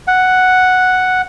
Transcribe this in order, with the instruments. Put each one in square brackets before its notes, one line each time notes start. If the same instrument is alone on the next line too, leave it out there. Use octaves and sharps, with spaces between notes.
[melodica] F#5